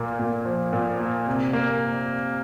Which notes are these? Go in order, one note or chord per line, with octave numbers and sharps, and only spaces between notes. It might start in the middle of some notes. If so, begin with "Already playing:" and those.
Already playing: A#2 A#3
A#2
F3
A#2
A#3
C3
A#3